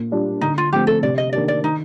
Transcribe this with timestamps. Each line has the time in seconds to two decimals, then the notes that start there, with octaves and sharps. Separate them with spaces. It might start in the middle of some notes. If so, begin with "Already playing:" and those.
Already playing: A#2
0.11 G3 D4 F4
0.41 D3 D#4
0.58 F4
0.72 F3 A3 C4 G4
0.87 A4
1.03 C3 D5
1.18 D#5
1.33 D#3 A#3 D4 G4 D5
1.48 D5
1.63 D#3 D#4